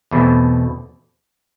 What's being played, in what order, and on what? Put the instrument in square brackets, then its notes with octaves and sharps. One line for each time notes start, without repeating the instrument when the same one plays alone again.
[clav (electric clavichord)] E2 B2 A3 C4 E4